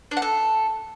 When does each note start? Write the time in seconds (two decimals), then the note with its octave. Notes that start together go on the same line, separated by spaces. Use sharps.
0.11 D4
0.17 F#5
0.22 A4